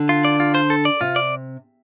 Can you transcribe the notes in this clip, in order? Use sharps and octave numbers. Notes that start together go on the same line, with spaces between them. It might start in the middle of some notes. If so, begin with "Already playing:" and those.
Already playing: D3
F4
D5
F4
C5
A4
D5
C3 F4
D5